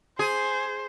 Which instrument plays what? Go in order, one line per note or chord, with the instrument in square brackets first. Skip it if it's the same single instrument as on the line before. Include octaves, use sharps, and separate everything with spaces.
[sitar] G#4 [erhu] C5